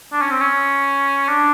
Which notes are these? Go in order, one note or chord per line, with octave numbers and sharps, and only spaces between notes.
D4
C#4
C4
C#4
D4